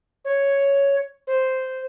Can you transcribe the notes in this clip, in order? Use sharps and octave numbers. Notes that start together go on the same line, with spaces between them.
C#5
C5